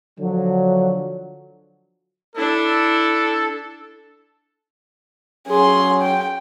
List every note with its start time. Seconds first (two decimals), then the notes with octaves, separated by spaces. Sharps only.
0.19 D3 F3 F#3
2.35 D4 E4 A4
5.47 F#3 C#4 G#4 C6
6.02 G5